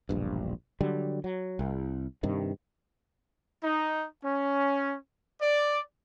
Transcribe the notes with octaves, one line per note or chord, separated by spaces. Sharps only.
E1 A#1 G2
D3 F#3 G3
F#3
C2
G2 C3 D#3
D#4
C#4
D5